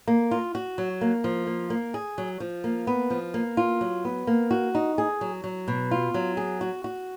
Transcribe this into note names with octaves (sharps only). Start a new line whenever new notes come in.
A#3
F4
F#4
F#3
A#3
F3
A#3
A#3
G#4
F#3
F3
A#3
B3
F3
A#3
F4
F#3
B3
A#3
F#4
D#4
G#4
F#3
F#3
B2
F4
F#3
G#4
F#4
F#4